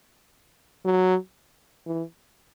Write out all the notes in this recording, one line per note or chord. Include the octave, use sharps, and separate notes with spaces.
F#3
E3